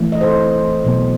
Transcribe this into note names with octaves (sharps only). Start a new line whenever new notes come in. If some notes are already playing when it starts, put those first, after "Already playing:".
Already playing: E3 A3
D#5
A4 C5
B2 F#3 B3